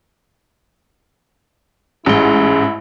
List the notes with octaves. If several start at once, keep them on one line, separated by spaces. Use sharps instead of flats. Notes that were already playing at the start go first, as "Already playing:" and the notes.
A1 G#2 C#4 E4 G#4 C6